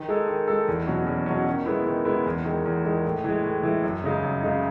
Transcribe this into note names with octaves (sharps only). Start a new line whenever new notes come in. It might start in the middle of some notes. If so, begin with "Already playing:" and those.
Already playing: D#3
G#3 D#4 A4
D#3
G#3 D#4 A4
E2
B2 F#3 C#4
E2
B2 F#3 C#4
D#3
G#3 B3 E4
D#3
G#3 B3 E4
E2
D#3 G#3
E2
D#3 G#3
A2
E3 G#3
A2
E3 G#3
F#2
C#3 G#3 D#4
F#2
C#3 G#3 D#4